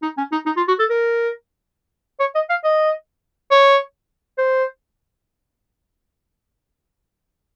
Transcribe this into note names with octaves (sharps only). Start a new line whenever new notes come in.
D#4
C#4
D#4
D#4
F4
F#4
A4
A#4
C#5
D#5
F5
D#5
C#5
C5